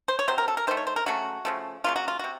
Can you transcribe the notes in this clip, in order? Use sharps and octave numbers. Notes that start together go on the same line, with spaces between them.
C5
C#5
C3 F#3 C5
A#4
A4
A#4
D#3 A3 C5
C#5
C5
A#4
C#3 F#3 A3 F#4
C#3 F3 A3
C#3 F#3 A#3 F4
F#4
F4
C3 F#4